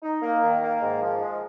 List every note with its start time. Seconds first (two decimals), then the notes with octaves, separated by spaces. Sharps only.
0.03 D#4
0.22 A#3
0.43 D#3
0.63 A#3
0.82 G#2
1.02 F3
1.21 G#3